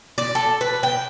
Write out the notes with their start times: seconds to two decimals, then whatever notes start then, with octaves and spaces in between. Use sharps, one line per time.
0.18 D5
0.35 A4
0.61 B4
0.83 G5